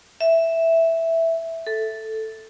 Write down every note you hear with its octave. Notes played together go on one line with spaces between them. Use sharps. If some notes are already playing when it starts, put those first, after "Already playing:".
E5
A4